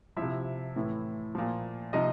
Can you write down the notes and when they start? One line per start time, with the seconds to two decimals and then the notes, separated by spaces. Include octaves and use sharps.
0.17 F3 E4 E5
0.22 C3
0.76 A2 E3
1.35 A#2 F3
1.93 C3 F3 D#4 D#5